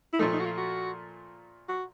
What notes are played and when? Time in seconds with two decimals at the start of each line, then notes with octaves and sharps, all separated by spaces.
0.13 E4
0.19 A#2 F3 A3 D#4
0.33 D#4
0.40 F#4
0.45 F4
0.58 F#4
1.69 F#4